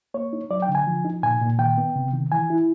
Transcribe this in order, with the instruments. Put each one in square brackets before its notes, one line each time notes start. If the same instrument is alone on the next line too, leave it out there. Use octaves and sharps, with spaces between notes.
[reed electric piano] A#3 C#5
D#4
F#3 D5
G5
D3
G#5
F3
D#4
A#2 G#5
A#2
D#3 G5
B3
C3
D#3
E3 G#5
E4